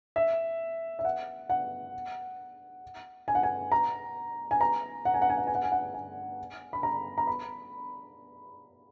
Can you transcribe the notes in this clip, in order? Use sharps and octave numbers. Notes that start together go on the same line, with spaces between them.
E5
E5
F#5
F#5
G#5
F#5
G#5
A#5
G#5
A#5
F#5
G#5
F#5
G#5
F#5
G#5
F#5
G#5
F#5
G#5
B5
A#5
A#5
B5